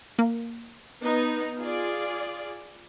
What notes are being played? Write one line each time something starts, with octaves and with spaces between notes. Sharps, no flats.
A#3
B3 D#4
F4 G#4 D5